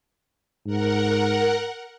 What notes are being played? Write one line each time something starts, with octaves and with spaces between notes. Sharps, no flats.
G#2 A#4 F#5